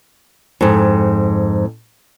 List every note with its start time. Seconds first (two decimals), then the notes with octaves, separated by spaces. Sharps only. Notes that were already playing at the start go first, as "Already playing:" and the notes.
0.61 F2 G#2